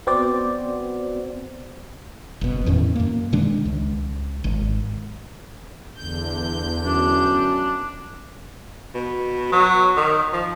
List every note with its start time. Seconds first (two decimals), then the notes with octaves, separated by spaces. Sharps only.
0.07 B3 C4 F#4 C5 D5
2.41 F#1 B2
2.66 E2 A2 D#3 C#4
2.95 F#2 A#3
3.32 B2 D#3 G#3 D4
3.65 C#2
4.44 G#1
5.97 E2 D3 G6
6.86 F#2 D4
8.94 B2
9.52 F#3
9.97 D#3
10.33 F3